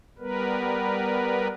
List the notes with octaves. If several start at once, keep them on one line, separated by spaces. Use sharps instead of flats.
G3 B3 A#4 B4